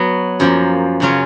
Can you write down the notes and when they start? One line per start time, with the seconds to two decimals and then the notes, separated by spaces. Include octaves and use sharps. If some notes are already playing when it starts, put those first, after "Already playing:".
Already playing: F#3 B3 F#4
0.40 F#2 F3 A#3
1.00 F#2 C#3 F#3 C#4 F4